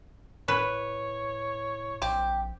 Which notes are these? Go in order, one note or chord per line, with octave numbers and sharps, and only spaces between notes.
A2 B4 C#5
A#1 C4 G4